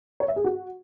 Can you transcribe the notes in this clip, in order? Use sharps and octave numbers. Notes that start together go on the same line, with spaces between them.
C#5
E5
G#4
F#4